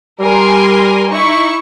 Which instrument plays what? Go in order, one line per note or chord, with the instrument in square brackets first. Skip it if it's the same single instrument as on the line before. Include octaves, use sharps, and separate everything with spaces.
[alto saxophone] G3 [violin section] A#4 G#5 C6
[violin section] D#4 E4 C#6